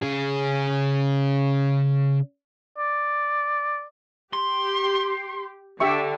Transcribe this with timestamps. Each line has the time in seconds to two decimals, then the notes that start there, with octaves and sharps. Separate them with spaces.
0.03 C#3 G#4
2.78 D5
4.33 G4 C6
5.80 D3 G4 E5 C#6